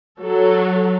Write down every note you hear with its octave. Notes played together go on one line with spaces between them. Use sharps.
F#3 A4